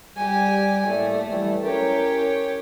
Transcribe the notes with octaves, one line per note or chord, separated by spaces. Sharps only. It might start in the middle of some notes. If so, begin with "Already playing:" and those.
G3 G4 G#5
A2 A3 A#3 D5
E3 F#3 G3
C#4 E4 G4 A#4 C#5